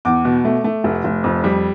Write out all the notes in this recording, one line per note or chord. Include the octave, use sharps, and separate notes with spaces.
E2 D6
B2
A3
A3
F1
F1
F2
G3